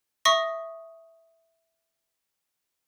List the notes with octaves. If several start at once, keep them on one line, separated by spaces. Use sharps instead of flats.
E5 C#6 D#6 A#6